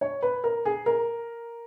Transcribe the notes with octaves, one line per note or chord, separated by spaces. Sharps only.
C#5
B4
A#4
G#4
A#4